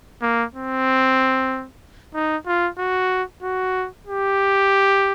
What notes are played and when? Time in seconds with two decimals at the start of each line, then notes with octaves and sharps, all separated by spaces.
0.22 A#3
0.54 C4
2.14 D#4
2.46 F4
2.78 F#4
3.42 F#4
4.07 G4